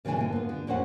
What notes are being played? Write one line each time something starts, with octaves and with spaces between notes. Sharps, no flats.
A#2 C#3 E3 F#3 D4 G#5
G#2 D3 A#3
B3 F4
D3
F2 A#2 C#4 C5 F#5